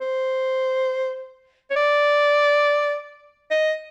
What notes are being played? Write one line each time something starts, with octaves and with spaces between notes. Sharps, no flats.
C5
C#5
D5
D#5